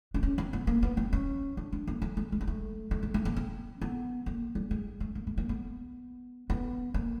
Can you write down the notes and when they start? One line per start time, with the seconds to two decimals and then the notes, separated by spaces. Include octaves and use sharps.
0.14 D4
0.23 C#4
0.38 C4
0.53 B3
0.67 A#3
0.83 B3
0.97 C4
1.13 C#4
1.57 D4
1.72 D4
1.87 A#3
2.02 A3
2.17 G#3
2.32 G#3
2.41 A#3
2.47 A3
2.91 A3
3.03 G#3
3.14 A3
3.25 A#3
3.36 C4
3.81 B3
4.26 A#3
4.55 G3
4.71 G#3
5.00 A3
5.15 A#3
5.27 A3
5.37 A#3
5.49 B3
6.50 B3
6.94 A#3